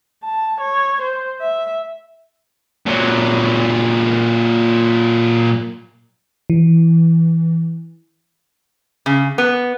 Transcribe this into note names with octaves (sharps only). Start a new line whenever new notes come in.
A5
C#5
C5
E5
A#2 F#3
E3
C#3
B3